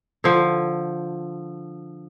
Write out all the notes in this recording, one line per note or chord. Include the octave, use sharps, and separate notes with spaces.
D3 F3